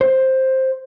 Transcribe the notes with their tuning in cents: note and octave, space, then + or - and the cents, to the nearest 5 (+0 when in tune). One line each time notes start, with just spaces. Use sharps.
C5 +10